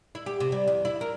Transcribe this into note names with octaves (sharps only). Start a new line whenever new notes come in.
E4
G4
C3
G3
E2
E4
A#4